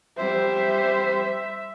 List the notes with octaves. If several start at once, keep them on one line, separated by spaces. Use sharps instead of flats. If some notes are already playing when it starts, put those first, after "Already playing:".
G3 C5 E5